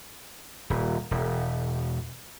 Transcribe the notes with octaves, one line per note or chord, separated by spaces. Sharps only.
D#1
E1